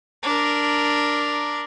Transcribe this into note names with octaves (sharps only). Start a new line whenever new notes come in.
D4 A#4